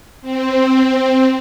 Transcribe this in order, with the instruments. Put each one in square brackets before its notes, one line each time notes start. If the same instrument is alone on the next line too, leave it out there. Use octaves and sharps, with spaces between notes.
[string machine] C4